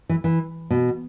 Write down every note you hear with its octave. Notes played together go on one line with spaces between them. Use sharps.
E3
E3
B2